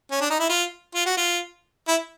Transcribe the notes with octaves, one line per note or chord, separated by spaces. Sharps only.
C#4
D4
D#4
E4
F4
F4
F#4
F4
E4